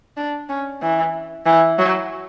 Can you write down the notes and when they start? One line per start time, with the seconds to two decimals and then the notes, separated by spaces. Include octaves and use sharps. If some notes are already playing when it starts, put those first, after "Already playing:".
0.17 D4
0.49 C#4
0.82 E3
1.46 E3
1.78 F#3